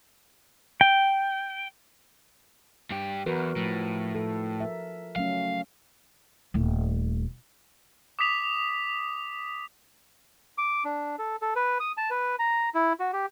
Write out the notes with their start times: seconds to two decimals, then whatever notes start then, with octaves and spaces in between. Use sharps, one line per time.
0.81 G5
2.91 G2 G4
3.26 E2 F#4 A#4 B4
3.56 A2 F3
4.15 A4
4.60 A#4 E5
5.16 F#3 A3 C#4 F5
6.54 D#1 A3
8.19 D6 D#6 B6 F7
10.58 D6
10.85 D4
11.19 A4
11.42 A4
11.56 B4
11.80 D#6
11.97 A5
12.10 B4
12.39 A#5
12.74 E4
13.00 F#4
13.13 G4